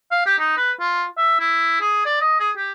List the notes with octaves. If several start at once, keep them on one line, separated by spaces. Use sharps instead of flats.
F5
G4
D#4
B4
F4
E5
E4
G#4
D5
D#5
G#4
G4